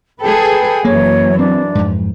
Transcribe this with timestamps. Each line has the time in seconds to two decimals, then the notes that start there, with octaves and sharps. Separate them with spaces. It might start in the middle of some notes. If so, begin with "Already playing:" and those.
0.21 G#4 A4 B4 G5
0.85 F#2 E3 A#3 C#5
1.39 C4 D4
1.75 F2 G#2